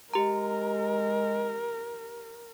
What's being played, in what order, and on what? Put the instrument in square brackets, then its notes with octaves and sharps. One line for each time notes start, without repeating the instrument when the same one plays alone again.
[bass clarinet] G#3 [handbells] G4 A#5 [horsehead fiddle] A#4